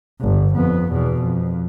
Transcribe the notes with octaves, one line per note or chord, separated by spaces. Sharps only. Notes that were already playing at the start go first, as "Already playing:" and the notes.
G1
F2 B3
E2 B2
F2